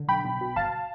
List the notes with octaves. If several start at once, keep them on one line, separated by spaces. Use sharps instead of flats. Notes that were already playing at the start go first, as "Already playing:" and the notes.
Already playing: D3
B1 G5 B5
B1
B2
G1 F5 A5